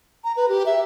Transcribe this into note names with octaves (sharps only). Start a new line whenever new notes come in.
A#5
B4
G4
E5